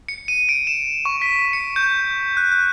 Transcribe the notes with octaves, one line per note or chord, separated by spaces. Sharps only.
C#7
D#7
D7
E7
C#6
B6
C#7
G6
F#6
F#6